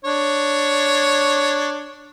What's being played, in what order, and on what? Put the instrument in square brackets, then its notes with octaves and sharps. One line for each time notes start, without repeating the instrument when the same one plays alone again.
[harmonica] D4 C#5